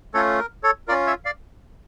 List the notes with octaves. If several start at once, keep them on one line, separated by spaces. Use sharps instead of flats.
A3 C#4 F4 A4 C#5
A#4
A4 C#5
C#4 F4 A#4 D5
C#5 E5
D5 F5